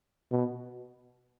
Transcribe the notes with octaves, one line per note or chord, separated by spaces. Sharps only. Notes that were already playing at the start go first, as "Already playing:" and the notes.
B2